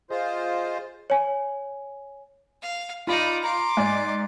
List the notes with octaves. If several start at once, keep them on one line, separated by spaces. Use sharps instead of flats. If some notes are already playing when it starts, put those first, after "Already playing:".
F4 G#4 C5 D#5
C#5 G#5
F5
D#4 F4 D5 B5
A#5 C6 D6
G#2 D5 G#5